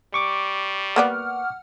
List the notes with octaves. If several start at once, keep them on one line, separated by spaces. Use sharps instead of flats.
G3 C#6 D6
A#3 B3 D5 F#5 F6